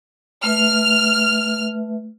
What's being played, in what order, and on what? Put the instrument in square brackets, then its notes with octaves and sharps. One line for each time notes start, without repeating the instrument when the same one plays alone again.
[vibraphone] A3 B4 E5 [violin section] F6